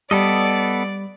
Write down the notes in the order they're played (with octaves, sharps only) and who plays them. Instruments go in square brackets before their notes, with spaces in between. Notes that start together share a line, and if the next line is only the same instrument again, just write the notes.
[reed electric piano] G3 [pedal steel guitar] B3 A4 D#5 [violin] D5